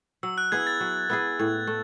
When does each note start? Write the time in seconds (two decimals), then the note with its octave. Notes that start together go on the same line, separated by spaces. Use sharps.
0.23 F#3 E6
0.38 F#6
0.52 B3 E4 G#4 G#6
0.67 A6
0.81 F#3
1.10 B3 E4 G#4
1.39 A2 G#6
1.67 A3